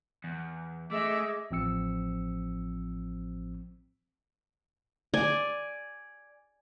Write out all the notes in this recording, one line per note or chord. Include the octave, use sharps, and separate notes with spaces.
E2
A3 G#4 D#5 E5 D6 E6
A1 F3 C4 E6 C#7
D5 G#5